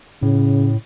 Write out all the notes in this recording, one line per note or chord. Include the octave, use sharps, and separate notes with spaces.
A2 C#3